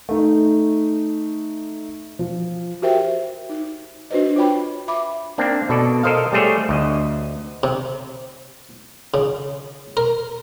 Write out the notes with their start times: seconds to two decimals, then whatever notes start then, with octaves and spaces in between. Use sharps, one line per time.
0.09 A3 D#4
2.19 F3
2.82 F#4 G4 A#4 C5 E5 G5
3.49 D#4
4.11 D4 F#4 B4 C5 D#5
4.36 F4 C#5 G5 B5
4.88 E5 B5 D6
5.38 A#3 C4 D4
5.69 B2 A4 D5
6.03 A4 A#4 C5 D#5 F5
6.32 G3 A3 G#4 C5 C#5
6.69 D2 D#5
7.63 C3
9.14 C#3
9.97 A#4